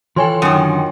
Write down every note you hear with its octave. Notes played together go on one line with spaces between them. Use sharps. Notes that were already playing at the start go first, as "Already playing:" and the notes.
E3 F4 A4 C#5 G5 G#5 C6
F#2 D3 D#3 F#3 C#4